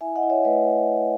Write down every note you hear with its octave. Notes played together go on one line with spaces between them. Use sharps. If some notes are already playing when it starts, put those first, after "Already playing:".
E4 E5 G#5
D#5 F#5
E4
C#5 E5
A3 B4 D#5